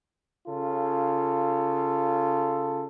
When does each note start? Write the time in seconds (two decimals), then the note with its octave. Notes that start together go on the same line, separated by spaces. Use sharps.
0.47 C#3 F4 A4